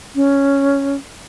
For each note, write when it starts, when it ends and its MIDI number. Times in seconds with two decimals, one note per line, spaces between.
0.15 0.96 61